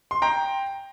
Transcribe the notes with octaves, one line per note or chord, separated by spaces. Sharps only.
C6
G5 A#5